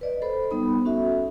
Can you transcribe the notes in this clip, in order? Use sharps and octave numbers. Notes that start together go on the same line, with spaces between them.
B4 D5 D#5
A4 C5 B5
G3 B3 D#4 B5
C#4 F#4 A4 E5